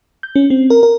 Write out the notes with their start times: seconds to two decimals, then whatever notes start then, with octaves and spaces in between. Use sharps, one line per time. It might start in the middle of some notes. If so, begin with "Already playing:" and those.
0.23 G6
0.36 C#4
0.50 C4
0.70 A#4
0.83 A#4